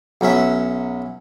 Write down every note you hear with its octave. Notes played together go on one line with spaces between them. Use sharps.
B1 F#3 C#4 E5